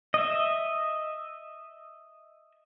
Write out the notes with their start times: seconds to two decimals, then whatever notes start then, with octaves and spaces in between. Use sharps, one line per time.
0.14 D#5 E5